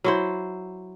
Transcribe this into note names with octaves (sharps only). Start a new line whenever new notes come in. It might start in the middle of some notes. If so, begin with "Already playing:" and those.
F#3 E4 C5